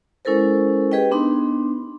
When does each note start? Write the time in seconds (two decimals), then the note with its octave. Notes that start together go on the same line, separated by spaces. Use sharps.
0.25 G#3 C#4 E4 A4 A#4 C5
0.92 G4 G#4 B4 D#5 G5
1.11 B3 D4 D#4 C6